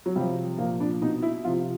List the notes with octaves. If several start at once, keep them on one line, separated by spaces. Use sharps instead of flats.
F#3
C3 F3 G3
A#2 F3 A#3
D4
B2 D#4
E4
C3 F3 F4